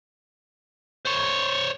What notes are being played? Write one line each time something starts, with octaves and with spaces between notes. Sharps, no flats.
C5 C#5